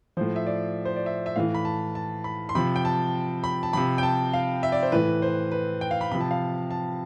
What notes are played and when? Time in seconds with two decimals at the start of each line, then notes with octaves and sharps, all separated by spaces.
0.17 A2 F3 C5
0.36 E5
0.47 D5
0.85 C5
0.96 D5
1.06 E5
1.26 E5
1.36 A2 E3 F5
1.55 B5
1.65 A5
1.95 A5
2.24 B5
2.49 C6
2.55 C3 F3 B5
2.76 G5
2.85 A5
3.44 B5
3.63 A5
3.73 C3 F3 B5
3.98 G5
4.03 A5
4.33 F5
4.63 E5
4.72 D5
4.83 C5
4.92 A2 E3 B4
5.22 C5
5.51 B4
5.81 G5
5.91 F5
6.01 B5
6.12 C3 F3 B5
6.21 A5
6.31 F5
6.71 A5